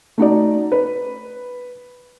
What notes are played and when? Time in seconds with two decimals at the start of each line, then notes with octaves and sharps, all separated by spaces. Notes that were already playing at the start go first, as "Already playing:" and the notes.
0.18 A3 D#4 F#4 D5
0.72 B4